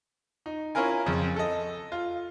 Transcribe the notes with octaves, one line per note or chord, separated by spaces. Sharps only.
D#4
C#4 E4 F4 A#4 G#5
F2 C#3
A4 D#5
F4